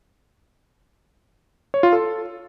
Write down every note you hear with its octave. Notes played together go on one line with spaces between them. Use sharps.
C#5
F4
A4